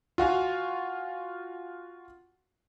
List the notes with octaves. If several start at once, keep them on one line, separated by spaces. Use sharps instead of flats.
F4 F#4 F5 G#5